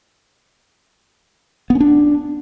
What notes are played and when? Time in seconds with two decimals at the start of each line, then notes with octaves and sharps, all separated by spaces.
1.70 B3
1.75 C#4
1.80 D4